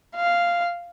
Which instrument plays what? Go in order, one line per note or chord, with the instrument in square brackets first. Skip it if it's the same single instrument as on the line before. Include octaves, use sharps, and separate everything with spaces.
[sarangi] F5